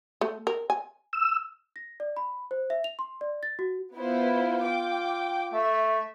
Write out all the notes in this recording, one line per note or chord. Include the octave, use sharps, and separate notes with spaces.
A3
A#4
G#5
E6
A#6
D5
B5
C5
E5
F7
C6
D5
A6
F#4
B3 E4 F4 C5
G5 D6
A3 E5